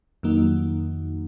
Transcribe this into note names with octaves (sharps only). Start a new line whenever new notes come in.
F2 D#3 F#3 A#3 D#4